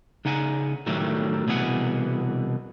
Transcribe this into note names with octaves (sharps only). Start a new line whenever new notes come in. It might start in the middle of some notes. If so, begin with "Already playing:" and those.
C#3 D#4 F#5 G#5
A2 D#3 F#3 G3 A3
C2 B2 E3 G#4 F#5